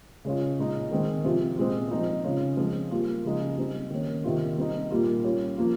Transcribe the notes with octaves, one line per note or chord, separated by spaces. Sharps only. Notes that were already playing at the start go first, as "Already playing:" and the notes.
C#3 G#3 C#4 F4
A#2 G#3 D#4
D#3 G#3 C4
C3 F3 C4 F4
A#2 G#3 C4 F4
F3 C4 D#4
C#3 G#3 C#4 F4
F3 G#3 C4 F4
G3 A#3 F4
C#3 F3 G#3 D#4
G3 C4 D#4
D#3 A#3 C#4
C3 D#3 A#3 F4
G3 C4 D#4
A#2 G3 A#3 F4
G3 C#4 F4
F3 A#3 F4